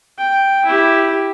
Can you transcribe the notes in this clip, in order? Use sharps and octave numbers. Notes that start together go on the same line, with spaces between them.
G5
E4 G4